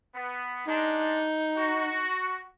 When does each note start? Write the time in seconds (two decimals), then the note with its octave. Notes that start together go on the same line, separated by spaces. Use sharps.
0.15 B3
0.67 G#3 D4 D#4
1.57 F#4